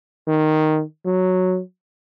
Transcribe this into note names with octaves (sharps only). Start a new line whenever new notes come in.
D#3
F#3